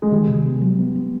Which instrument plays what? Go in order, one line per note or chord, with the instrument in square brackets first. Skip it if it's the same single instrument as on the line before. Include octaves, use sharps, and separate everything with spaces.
[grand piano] G#3
[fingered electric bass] D#3 [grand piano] G3
[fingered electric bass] C3
B3
F#3
B3
B3